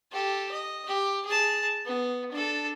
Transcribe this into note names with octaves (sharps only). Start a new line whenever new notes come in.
G4 A4
D#5
G4
G#4 A5
B3
D4 A4